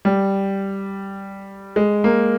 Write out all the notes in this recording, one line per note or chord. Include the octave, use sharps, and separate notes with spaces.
G3
G#3
A#3